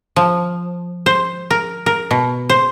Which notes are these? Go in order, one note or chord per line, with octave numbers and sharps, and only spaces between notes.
F3
C5
A#4
A#4
B2
C5